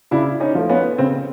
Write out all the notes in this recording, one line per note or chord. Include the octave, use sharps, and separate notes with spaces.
C#3 D4 E4
C#4 D#4
F3 A3
B3 C#4
C#3 C4